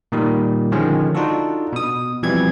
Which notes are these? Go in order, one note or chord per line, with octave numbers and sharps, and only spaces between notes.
A#2 D#3 G3
D3 D#3 F3 G#3 C#4
D4 D#4 F4 F#4 A4
B2 D#6
B2 E3 F3 G3 C4 G#6